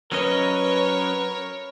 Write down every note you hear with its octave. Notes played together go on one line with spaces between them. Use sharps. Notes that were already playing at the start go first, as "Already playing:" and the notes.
F#3 C#4 A#4 B4 C#5 D#5